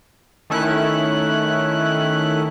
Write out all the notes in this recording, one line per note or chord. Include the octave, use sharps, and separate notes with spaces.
D#3 A3 C#4 E4 F#6